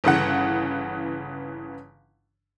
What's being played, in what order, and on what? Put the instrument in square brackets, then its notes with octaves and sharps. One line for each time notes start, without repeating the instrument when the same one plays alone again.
[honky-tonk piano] G1 C#3 E3 F#5